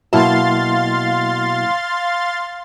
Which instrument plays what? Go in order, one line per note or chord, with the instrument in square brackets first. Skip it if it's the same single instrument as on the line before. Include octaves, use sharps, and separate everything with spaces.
[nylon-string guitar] B2 A5 [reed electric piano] F#3 A#3 E4 [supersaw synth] F5 C6 A6